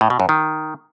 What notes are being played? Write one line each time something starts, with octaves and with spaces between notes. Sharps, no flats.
A2
B2
F#2
D#3